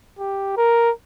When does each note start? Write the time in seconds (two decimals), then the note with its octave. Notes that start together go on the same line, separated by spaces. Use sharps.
0.19 G4
0.57 A#4